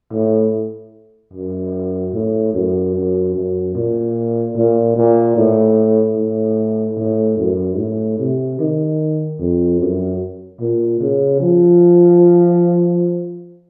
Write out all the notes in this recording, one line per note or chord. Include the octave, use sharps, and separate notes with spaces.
A2
F#2
A2
F#2
F#2
F#2
A#2
A#2
A#2
A2
A2
A2
F#2
A2
C3
D#3
F2
F#2
A#2
C#3
F3